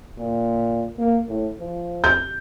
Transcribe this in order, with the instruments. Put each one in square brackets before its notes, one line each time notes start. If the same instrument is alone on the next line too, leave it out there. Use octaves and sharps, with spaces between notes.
[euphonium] A#2
A#3
A2
F3
[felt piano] G6